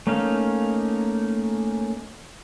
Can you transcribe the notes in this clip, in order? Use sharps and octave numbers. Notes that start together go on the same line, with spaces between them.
A3 A#3 C#4 D#4 F5